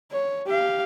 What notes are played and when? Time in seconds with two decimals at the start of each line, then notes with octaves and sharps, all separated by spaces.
0.12 C#5
0.47 G4 F5